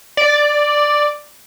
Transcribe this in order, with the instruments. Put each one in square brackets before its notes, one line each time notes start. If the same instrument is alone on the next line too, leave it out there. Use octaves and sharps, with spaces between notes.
[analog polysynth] D5